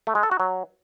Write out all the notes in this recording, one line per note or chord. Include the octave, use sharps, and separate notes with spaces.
A3
G#3
A4
F#4
F#3